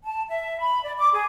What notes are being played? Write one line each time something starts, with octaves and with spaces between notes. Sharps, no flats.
A5
E5
B5
D5
D6
G#4